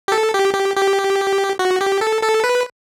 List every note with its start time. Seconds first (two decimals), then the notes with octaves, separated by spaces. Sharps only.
0.08 G4
0.12 A4
0.34 G4
0.54 G4
0.76 G4
1.59 F#4
1.81 G4
2.01 A4
2.23 A4
2.44 B4